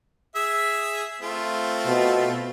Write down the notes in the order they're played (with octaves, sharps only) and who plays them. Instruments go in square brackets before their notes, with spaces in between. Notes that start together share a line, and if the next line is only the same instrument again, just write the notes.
[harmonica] G#4 E5 E6
A3 C4 F4
[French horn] B2